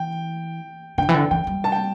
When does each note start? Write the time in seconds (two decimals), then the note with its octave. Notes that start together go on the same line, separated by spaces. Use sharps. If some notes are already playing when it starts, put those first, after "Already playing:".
Already playing: E3 G5
0.98 D3 G5
1.09 E3
1.14 D3
1.31 E3 G5
1.47 G3
1.64 A5
1.72 G5